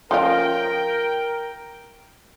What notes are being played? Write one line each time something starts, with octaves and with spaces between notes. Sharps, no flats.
F3 C#4 F4 A#4 G5